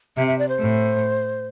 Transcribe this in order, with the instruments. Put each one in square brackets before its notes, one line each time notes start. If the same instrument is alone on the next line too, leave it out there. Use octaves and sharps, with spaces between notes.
[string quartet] C3 [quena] E5
[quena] E5
D5
C5
[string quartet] A2